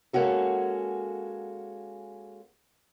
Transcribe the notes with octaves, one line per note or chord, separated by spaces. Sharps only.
G#3 A#3 C#4 F#4 A4